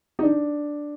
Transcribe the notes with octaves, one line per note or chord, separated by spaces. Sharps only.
D#4
D4